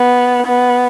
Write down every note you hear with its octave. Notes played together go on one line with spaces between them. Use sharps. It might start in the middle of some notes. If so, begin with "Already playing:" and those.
Already playing: B3
B3